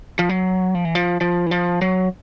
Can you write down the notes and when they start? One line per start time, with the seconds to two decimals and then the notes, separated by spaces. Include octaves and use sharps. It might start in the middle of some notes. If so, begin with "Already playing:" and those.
0.19 F3
0.29 F#3
0.75 F3
0.85 E3
0.95 F3
1.21 F3
1.46 E3
1.51 F3
1.82 F#3